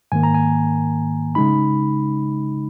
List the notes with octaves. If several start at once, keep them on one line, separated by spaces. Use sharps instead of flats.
G#2 D#3 A#3 G#5
A#5
G#5
C#3 G#3 D#4 B5